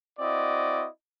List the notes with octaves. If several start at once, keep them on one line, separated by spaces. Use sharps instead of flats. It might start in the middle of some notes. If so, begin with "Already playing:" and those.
C4 E4 F#4 D5 D#5